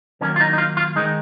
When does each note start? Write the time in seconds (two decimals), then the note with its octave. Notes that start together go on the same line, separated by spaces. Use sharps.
0.21 D#3 F#3 A#3 C#4
0.36 F4
0.40 D#4
0.53 D#4
0.58 F4
0.77 F4
0.96 D#3 G#3 D#4